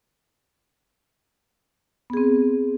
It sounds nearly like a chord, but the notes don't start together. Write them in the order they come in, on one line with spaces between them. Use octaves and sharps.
B3 G#4 C4